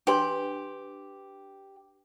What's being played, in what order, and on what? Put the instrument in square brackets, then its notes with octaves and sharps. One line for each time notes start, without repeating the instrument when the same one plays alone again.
[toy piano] D4 B4 C6 [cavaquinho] G4 G5